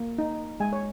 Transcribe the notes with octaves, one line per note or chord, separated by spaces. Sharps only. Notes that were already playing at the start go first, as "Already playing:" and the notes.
Already playing: A#3
D#4
G#3 G#5
C#5